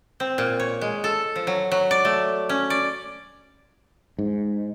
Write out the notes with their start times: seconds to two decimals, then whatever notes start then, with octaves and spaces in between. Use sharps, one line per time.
0.20 C4
0.38 A#2
0.60 C#5
0.81 G#3
1.04 A4
1.36 F3
1.47 F#3
1.72 F#3
1.91 D5
2.05 A3
2.49 C#4
2.70 D5
4.19 G#2